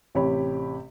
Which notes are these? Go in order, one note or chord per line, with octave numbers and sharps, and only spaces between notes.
A1 C3 G4 C#5 G5 B5